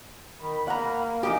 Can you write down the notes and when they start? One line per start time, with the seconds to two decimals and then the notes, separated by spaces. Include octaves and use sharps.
0.40 D#3 B5
0.68 A#3 F#5 A#5
1.23 E3 A#3 D#4 G4 D#6